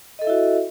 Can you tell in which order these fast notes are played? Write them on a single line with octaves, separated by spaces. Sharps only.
D#5 A4 E5 E4 F#4